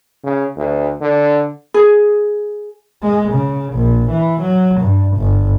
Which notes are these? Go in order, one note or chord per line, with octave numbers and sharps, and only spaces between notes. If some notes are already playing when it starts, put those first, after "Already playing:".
C#3
D2
D3
G#4
G#3
C#3
A#1
E3
F#3
G2
G1